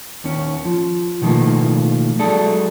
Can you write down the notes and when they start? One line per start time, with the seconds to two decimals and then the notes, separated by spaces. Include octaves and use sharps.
0.24 D#2 C#4
0.65 F3
1.22 B2 D#3 F3 F#3 A3 A#3
2.19 F#3 G#3 D4 A4